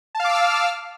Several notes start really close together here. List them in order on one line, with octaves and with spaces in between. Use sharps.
A5 F5 D6 E6 F6